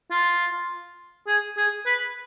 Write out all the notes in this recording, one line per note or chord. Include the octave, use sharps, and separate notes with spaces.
F4
G#4
G#4
B4